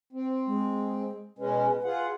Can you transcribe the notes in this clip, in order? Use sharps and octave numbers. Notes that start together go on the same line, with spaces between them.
C4
G#3
B2 G#3 C#4 B4
F4 G#4 F#5